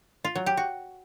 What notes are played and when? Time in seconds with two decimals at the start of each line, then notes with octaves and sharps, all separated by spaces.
0.24 F4
0.35 F#3
0.46 G4
0.57 F#4